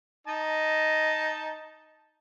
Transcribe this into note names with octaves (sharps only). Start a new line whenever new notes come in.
D#4 D#5 A5